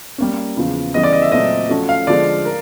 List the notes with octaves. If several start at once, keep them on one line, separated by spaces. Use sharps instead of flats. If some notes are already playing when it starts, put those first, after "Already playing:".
G3 A#3 C#4
E2 C#3 F3
C#3 E3 G3 B3 D#5
D5
D#5
E5
A#2 F#3 A3 C4 D#5
F3 A3 C#4 F#4 A4
F5
D3 F3 G#3 D5
A#4